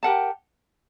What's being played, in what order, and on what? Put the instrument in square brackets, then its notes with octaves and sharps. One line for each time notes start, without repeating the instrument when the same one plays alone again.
[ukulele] G4 A#4 F#5 A5